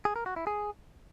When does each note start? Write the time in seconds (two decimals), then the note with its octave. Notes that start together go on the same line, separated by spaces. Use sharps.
0.05 G#4
0.16 A#4
0.26 F#4
0.36 E4
0.47 G#4